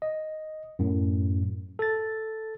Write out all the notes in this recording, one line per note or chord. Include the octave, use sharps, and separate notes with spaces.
D#5
F#2 A2
A4 A6